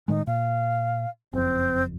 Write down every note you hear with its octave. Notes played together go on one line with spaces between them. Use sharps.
A2 D#3 G#3 D#4
A#2 F5
F#1 F2 C4